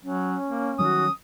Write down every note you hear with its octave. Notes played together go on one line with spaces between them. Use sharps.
F#3 C#4
A#3
D#3 F#3 G3 F#4 D#6